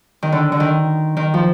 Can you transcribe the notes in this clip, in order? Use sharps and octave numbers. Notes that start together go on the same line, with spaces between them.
D#3
D3
D3
D#3
D#3
F3